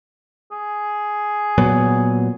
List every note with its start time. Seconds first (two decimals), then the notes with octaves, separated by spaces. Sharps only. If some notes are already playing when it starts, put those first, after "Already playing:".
0.51 G#4
1.58 A#2 F#3 B3